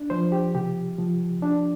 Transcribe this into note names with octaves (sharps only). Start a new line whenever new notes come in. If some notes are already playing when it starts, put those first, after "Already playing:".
Already playing: D4
F3 C5
G4
C3 G4
F3
D4